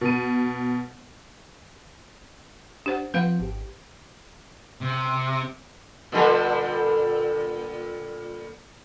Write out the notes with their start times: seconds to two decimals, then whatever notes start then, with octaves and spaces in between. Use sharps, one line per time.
0.01 B2 D#7
2.86 D4 G4 C5 F#5
3.14 F3 C4 B4 F5 F#5
3.39 G#1 G4
4.81 C3
6.12 A#2 D3 G3